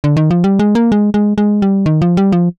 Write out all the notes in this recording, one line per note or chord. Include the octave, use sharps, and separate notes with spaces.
D3
D#3
F3
G3
G#3
A#3
G#3
G#3
G#3
G3
D#3
F3
G3
F3